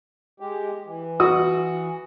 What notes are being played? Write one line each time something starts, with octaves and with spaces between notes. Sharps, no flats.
G#3 G4
E3
F#4 D#6